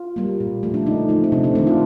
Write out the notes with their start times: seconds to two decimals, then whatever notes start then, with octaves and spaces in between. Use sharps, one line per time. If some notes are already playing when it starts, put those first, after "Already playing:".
Already playing: F4
0.16 G3 A#3
0.40 A#2
0.63 F3 A3
0.74 D4
0.86 D3 D#4
1.09 F3 A3
1.24 C4
1.32 C3 D4
1.44 C4
1.55 D#3 A3 D4
1.67 F4